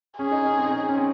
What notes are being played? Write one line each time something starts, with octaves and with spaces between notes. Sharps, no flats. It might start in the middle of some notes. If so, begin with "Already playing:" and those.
C#4 G#4
D#4
C#4
C4
D#4
C#4
C#4
C4